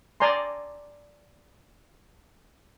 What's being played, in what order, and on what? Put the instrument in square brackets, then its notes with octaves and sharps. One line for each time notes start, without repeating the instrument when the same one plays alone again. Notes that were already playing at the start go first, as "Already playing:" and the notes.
[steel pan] D5 G#5 A#5 C6